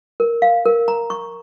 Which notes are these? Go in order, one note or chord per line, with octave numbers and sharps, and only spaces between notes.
A#4
F5
A#4
A#5
C#6